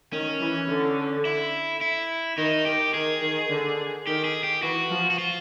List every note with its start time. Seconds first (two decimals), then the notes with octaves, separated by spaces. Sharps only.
0.13 D#3 C#4
0.41 E3
0.69 D3
1.25 E4
1.81 E4
2.38 D#3 D#4
2.65 D#3 G4
2.94 D#3 G#4
3.21 D#3
3.50 D3
4.06 D#3 G4
4.24 G#4
4.43 G4
4.63 E3 F#4
4.91 F3
5.10 F#4
5.18 F4